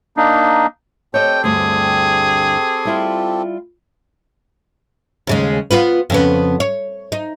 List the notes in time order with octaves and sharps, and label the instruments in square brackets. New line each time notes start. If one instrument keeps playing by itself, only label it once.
[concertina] A#3 D4 D#4
[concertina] C4 G4 A4 [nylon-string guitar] C#5 D#5 [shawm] G5
[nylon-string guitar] D2 G2 [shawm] G#4
[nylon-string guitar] G3 E4 F4
[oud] D#2 C#3 G#3
B3 F4 B4
F2 C#3 B3
C#5
D#4